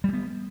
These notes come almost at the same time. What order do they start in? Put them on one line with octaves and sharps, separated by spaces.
G3 G#3 B3